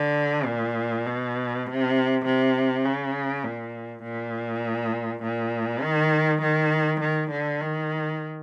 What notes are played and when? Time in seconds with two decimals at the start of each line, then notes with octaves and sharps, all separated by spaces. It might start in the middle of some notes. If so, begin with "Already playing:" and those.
Already playing: D3
0.47 A#2
1.06 B2
1.66 C3
2.26 C3
2.85 C#3
3.45 A#2
4.03 A#2
5.23 A#2
5.82 D#3
6.42 D#3
7.01 D#3
7.31 D3
7.61 D#3